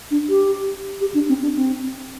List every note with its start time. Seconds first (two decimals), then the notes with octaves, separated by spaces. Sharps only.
0.11 D4
0.29 G4
1.01 G4
1.14 D4
1.29 C4
1.42 D4
1.56 C4